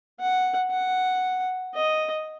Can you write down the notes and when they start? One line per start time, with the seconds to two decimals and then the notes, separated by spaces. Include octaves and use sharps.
0.20 F#5
0.71 F#5
1.74 D#5